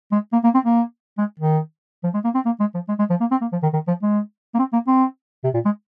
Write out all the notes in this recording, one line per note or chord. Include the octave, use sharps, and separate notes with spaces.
G#3
A#3
A#3
C4
A#3
G#3
D#3
F3
G#3
A#3
C4
A#3
G#3
F3
G#3
G#3
F3
A#3
C4
A#3
F3
D#3
D#3
F3
G#3
A#3
C4
A#3
C4
C3
A#2
G#3